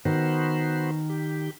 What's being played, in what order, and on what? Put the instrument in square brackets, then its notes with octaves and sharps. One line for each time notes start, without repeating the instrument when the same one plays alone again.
[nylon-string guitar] D#3 [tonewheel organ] B3 F#4 C5
[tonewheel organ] G4